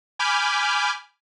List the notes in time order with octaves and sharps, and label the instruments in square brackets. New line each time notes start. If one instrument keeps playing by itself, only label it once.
[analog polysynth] G#5 B5 D6 F6 G6